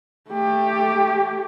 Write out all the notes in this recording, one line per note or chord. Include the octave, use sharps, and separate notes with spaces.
A3 G4